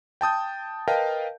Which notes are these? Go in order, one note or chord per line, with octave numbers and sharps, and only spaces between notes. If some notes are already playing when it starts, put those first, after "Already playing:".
G5 A5 D#6 G6
A#4 B4 D#5 F5 G5 A5